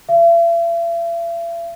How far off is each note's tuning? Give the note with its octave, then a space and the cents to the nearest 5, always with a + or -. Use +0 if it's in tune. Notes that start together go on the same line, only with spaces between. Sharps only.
E5 +45